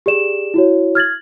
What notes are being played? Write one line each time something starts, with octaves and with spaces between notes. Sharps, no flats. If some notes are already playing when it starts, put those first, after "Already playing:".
G4 G#4 D5 E7
E4 F#4 C#5
F6 G#6 A6 F#7